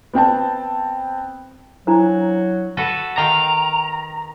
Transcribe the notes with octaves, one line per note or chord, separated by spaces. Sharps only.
B3 C4 G5 A5
F#3 D4 E4 C5
F#4 A4 B4
D#3 F5 G5 A#5